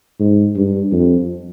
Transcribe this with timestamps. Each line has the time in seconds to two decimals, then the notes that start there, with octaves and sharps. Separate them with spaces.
0.20 G#2
0.56 G2
0.92 F2